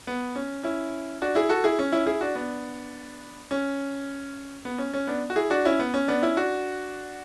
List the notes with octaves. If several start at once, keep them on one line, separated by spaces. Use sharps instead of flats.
B3
C#4
C#4 E4
D4 F#4
E4 G#4
F#4 A4
E4 G#4
C#4
C#4 E4
E4 G#4
D4 F#4
B3 D4
C#4
B3
C#4
C#4
B3 D4
F#4
E4 G#4
D4 F#4
C#4 E4
B3
C#4
B3 D4
C#4 E4
D4 F#4